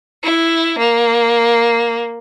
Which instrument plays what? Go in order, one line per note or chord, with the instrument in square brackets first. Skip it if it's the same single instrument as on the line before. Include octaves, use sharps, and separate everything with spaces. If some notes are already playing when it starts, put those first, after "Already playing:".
[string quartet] E4
A#3